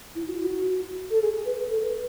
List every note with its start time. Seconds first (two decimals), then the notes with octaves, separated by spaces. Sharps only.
0.15 E4
0.27 F#4
0.36 E4
0.45 F#4
1.10 A4
1.22 G#4
1.46 B4
1.70 A4
1.83 B4